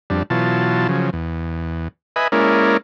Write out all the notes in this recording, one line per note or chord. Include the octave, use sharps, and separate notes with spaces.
F2 G3 D4
B2 E3 F#3 F4 A5
C#3 F3 F#3
E2
B4 D#5 E5 G#5 B5
G#3 A#3 C#4 E4 A#4 D5